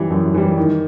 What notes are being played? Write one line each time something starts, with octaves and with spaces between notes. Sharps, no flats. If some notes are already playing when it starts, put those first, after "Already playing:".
Already playing: F#2 E3 G3
F#2
E3 G3
D#3